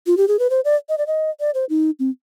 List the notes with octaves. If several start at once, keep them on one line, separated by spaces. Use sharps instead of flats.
F4
G4
G#4
B4
C5
D5
D#5
D5
D#5
D5
C5
D#4
C4